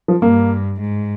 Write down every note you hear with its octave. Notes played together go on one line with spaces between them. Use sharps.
F3
G2 A#3
G#2